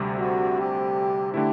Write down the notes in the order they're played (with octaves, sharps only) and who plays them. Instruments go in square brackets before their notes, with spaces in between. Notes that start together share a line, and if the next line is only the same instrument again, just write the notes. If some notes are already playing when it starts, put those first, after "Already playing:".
Already playing: [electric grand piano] D2 C3 G3 C4
[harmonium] F#4
G4
[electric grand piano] D3 A3 E4 [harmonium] G4